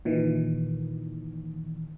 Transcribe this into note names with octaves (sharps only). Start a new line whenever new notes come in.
A#2 D#3 E3